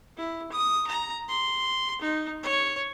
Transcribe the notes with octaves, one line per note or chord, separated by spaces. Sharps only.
E4
D#6
A#5
C6
D#4
C#5